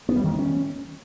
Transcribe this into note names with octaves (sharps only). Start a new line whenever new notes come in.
B3
G3
D#3
A#3
C#4